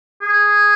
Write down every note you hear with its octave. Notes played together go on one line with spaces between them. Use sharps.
G#4